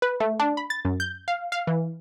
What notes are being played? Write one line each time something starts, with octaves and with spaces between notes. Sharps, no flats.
B4
A3
D4
B5
A6
F#2
G6
F5
F5
E3